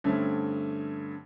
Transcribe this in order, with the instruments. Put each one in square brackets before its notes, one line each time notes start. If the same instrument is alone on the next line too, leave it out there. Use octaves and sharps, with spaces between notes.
[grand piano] G2 D3 A3 C4 C#4